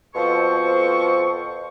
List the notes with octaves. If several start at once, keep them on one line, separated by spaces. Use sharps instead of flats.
F2 B2 F3 A4 C5 C#6